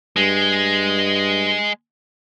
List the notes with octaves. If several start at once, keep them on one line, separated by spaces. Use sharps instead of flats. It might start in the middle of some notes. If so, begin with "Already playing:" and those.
G2 G#3